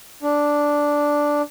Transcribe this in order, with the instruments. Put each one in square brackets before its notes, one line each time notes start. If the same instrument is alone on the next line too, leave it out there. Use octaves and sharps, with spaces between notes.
[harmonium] D4